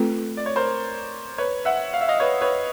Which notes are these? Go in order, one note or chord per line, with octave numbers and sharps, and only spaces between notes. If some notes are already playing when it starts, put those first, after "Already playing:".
Already playing: A3 C4 F4 A4 B4
D5
C#5
A#4 C5
B4 C#5
E5 F#5
F5
E5
D#5 F5
B4 C#5
B4 C#5